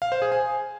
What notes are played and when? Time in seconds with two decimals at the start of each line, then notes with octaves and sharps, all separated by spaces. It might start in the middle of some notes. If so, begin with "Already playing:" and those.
0.02 F5
0.12 C5
0.22 G#4
0.32 G#5